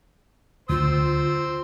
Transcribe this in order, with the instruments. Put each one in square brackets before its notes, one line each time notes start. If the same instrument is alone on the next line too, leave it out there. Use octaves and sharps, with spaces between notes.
[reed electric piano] D2 [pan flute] F4 [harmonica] C5 E6